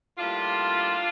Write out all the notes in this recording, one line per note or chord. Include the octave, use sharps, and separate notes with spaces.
A2 G3 A#3 D4 F4